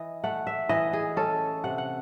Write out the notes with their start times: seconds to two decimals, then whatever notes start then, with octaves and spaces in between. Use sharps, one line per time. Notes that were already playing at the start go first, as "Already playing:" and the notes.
Already playing: E3 D#5
0.24 A3 F#5
0.47 E5
0.69 E3 D#5
0.93 G#4
1.16 C#4 A4
1.64 C3 F#5
1.78 F#5